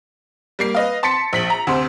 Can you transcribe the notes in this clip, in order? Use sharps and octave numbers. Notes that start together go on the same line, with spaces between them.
G3 A#3 C7
B4 D#5 F5
A5 C6 A6 B6 C#7
A#1 B6 F#7
A#5
D2 C3 C5